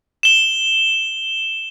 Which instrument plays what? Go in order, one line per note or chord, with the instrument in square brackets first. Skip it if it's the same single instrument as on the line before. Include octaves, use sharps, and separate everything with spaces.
[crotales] E7 G7